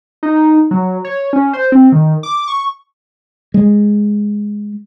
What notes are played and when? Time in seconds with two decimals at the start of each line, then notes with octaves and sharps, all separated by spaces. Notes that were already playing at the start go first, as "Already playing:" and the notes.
0.23 D#4
0.71 F#3
1.05 C#5
1.33 C#4
1.53 C5
1.72 C4
1.92 D#3
2.23 D6
2.48 C#6
3.54 G#3